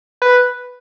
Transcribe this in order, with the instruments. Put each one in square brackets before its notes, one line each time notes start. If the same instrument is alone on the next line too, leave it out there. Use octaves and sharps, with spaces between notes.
[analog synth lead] B4